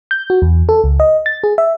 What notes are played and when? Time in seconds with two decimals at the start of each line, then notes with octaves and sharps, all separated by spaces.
0.11 G6
0.30 F#4
0.42 E2
0.69 A4
0.84 C#2
1.00 D#5
1.26 A6
1.44 G#4
1.58 E5